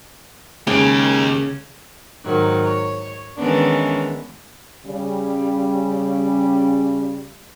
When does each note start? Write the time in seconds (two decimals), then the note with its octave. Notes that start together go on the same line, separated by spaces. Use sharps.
0.67 D#2 C#3 G#3 G4 D7
2.26 G#2 D#3 F#3
2.64 C#5
3.37 D#3 E3 G#3 B3 C#4 D4
4.86 C#3 G3